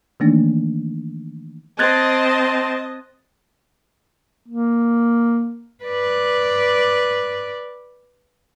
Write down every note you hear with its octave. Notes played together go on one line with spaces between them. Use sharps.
D#3 E3 A3 A#3 D4 D#4
C4 D#5 A5 F#6 G#6 A6
A#3
B4 D5